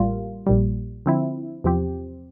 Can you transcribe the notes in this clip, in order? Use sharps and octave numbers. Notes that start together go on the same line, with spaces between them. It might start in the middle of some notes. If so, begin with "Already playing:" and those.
Already playing: A1 A2 G3 A#3 F4
A#1 A#2 G3
D3 F3 C4 E4
E2 C3 F3 C4 G4